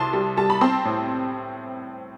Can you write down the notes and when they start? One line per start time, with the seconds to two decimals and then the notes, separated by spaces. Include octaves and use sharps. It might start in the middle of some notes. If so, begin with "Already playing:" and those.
Already playing: C2 A5 C6
0.13 G3
0.37 G3 A5
0.50 B5
0.61 C4 A5 C6
0.85 A2